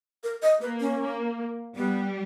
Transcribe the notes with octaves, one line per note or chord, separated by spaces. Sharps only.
A#4
D#5
A#3 B4
C#4
A#3
G3 B3